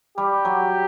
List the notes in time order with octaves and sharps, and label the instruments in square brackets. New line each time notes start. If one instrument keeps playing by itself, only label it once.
[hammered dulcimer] G3 [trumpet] G4
[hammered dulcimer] F#3